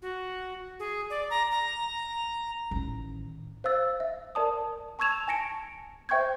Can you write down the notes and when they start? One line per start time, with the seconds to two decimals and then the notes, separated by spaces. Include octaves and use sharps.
0.02 F#4
0.79 G#4
1.10 D5
1.30 A#5
1.51 A#5
2.71 A1 D#3
3.64 C5 F5 E6 A6
4.00 E5
4.35 A#4 D5 A5 D#6
4.99 A5 C#6 E6 G#6 E7 F7
5.28 G#5 A5 A#6 C#7 D7
6.09 C5 E5 G5 C#6 G6 G#6